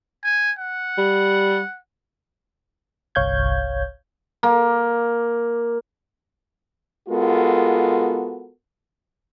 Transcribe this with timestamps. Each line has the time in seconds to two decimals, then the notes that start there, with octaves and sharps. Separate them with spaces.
0.24 G#5
0.59 F#5
0.98 G3
3.15 G1 C2 C#5 F5 G6 G#6
4.43 A#3
7.09 G#3 B3 F4 F#4 A4 A#4